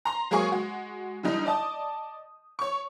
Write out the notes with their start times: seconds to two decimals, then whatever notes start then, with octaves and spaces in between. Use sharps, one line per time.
0.05 A#5 C6
0.31 F#3 G#3 A#3 G#4 G#5 C#6
0.52 G#3 F#4
1.23 D3 E3 G3 D#4
1.45 D5 D#5 A5 D#6
2.59 C#5 C#6